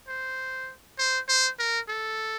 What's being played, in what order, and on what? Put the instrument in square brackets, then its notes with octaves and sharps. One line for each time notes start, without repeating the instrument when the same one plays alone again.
[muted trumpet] C5
C5
C5
A#4
A4